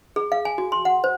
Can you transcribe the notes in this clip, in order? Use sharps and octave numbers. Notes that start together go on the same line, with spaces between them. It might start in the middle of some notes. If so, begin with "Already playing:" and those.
G#4
F5
G#5
F#4
C6
F#5
C5